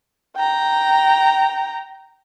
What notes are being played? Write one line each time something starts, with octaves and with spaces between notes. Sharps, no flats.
G5 A#5